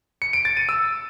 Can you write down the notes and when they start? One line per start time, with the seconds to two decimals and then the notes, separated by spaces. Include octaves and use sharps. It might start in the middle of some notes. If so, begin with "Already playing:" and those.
0.22 C#7
0.33 D7
0.45 A6
0.57 D#7
0.69 E6